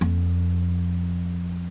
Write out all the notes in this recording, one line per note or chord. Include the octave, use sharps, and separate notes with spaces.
F2